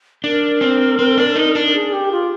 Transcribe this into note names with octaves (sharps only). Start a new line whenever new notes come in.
D4 A#4
C4
C4
D4
D#4
D4
G#4
G4
F4